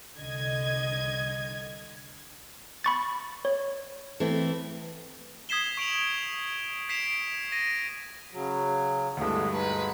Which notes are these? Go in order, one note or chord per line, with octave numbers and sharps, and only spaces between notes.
C2 D3 D#5 G#6
B5 C#6 A6
C#5
E3 A3 C4
D#6 G#6 B6 C7 E7 G7
C#6 D7 F7 F#7
G#6 B6 C7 D7 E7 F7
A#6 D#7
C#3 F#3
D2 G2 E3 G#3 A3 B3
G#3 D#4 B4